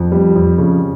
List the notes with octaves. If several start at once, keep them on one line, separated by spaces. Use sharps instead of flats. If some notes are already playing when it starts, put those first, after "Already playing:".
Already playing: F2
G3
F2
C#3